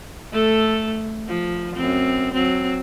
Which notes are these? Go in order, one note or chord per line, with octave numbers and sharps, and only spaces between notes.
A3 A4
F3
F#2 C4
F#3 C4